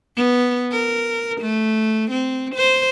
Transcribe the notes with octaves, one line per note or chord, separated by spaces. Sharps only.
B3
A#4
A3
C4
C5